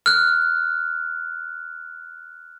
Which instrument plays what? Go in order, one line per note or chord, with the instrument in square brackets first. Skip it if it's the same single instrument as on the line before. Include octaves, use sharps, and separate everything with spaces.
[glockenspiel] F6 F#6